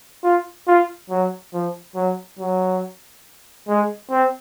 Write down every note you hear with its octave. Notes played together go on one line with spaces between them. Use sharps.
F4
F4
F#3
F3
F#3
F#3
G#3
C4